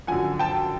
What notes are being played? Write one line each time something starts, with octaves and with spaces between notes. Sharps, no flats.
F#2 D3 F3 F#5 G#5
G5 A5